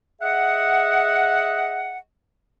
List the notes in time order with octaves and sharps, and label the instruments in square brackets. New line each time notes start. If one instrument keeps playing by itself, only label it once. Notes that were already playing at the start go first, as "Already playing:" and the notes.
[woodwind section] G#4 D#5 E5 F#5